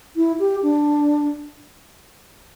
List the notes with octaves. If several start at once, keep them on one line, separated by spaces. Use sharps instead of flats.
E4
G4
D4